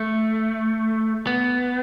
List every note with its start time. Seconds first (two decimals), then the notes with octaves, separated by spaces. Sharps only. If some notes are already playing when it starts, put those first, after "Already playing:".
Already playing: A3
1.27 B3